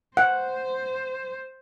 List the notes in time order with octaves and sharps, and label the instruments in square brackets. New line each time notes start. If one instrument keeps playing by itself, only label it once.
[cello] C5 [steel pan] F#5